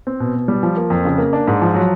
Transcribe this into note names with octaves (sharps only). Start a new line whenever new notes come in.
C4
B2
B2
G3
F3
A#3
F2
C#3
A#3
D4
G#2
F3
F#3